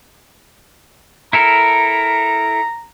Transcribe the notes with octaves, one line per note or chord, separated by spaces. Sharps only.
E4 A4 A#4 A#5